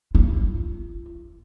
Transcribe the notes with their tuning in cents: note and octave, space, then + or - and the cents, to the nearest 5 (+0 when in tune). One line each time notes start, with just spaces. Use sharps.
F4 -40